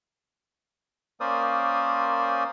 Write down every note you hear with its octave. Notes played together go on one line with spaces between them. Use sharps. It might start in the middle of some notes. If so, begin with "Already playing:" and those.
A#3 C#4 A#4 C5 D5 D#6